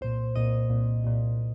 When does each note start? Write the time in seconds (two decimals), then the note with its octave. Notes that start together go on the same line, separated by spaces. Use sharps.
0.01 C2 A#2 C5
0.36 C2 A#2 D#5
0.70 C2 A#2
1.04 C2 A#2